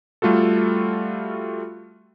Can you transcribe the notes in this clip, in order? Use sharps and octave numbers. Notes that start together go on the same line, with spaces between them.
G3 A3 F4 F#4 A4